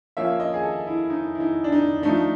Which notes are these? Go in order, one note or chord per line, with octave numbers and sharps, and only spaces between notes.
F3 A#3 C#4 E5
D#5
G#4
A4
E4
D#4
E4
D#4
D4
D#4
F3 A3 D4 D#4